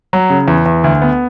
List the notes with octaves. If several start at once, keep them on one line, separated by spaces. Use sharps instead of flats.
F#3
C#3
E2
E2
D2
B3